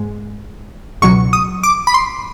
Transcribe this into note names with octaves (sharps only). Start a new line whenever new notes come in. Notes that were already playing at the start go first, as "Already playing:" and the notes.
Already playing: G#2 G#3
C#2 B2 F#3 C#6
D#6
D6
B5
C6